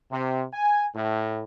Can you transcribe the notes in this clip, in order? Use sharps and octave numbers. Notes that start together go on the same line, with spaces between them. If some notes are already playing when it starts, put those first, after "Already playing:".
C3
G#5
A2